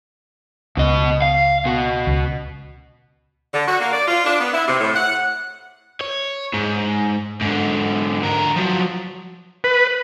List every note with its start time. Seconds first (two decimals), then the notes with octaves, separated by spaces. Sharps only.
0.77 C#2 B2 D#5
1.22 F5
1.65 B2 F#4
2.07 C#2
3.53 D3
3.67 F#4
3.80 A#3
3.93 D5
4.07 F4
4.25 D4
4.39 B3
4.53 E4
4.67 C3
4.80 A2
4.95 F#5
6.01 C#5
6.53 G#2
7.42 G#2 D3
8.23 D3 A#4
8.56 F3 F#3
9.64 B4